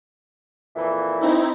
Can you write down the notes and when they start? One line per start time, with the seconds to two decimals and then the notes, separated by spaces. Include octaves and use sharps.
0.76 F2 A#2 E3
1.21 C4 D#4 E4